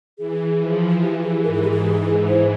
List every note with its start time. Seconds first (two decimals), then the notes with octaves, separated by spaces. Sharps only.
0.18 E3 G#4
0.60 F3
1.02 E3 G4
1.23 G#4
1.43 G#2 A#4
1.53 G#4
1.63 G4
1.71 G#4
2.28 C5